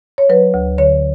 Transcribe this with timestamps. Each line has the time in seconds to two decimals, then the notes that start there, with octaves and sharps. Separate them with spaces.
0.18 C#5
0.29 F#3 B4
0.54 D2
0.78 D3 C#5